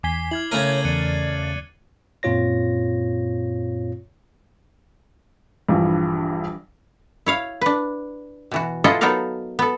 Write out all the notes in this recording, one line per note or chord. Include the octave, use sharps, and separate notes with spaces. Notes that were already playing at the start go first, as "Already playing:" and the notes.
E2 G#5 D6 B6 C7 G7
E4 F6 G#6 F#7
C#3 A3 A#4 C#5 A6 D#7
E2 D5 F#6 C#7 D#7
F#2 A#2 C4 F4 C#5 A#6
A#1 G2 E3 F3
E4 C#5 F5
D4 B4
B2 E3 F#4
E4 F4 G#4 A4 D#5 F#5
F#3 B3 D#4 A4 A#4 F5
B3 A4